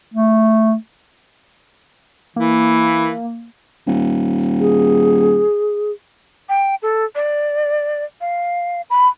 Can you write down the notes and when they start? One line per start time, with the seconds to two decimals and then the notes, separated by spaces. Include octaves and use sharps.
0.14 A3
2.36 E3 A#3
3.86 D#1
4.60 G#4
6.49 G5
6.82 A4
7.15 D5
8.21 F5
8.90 B5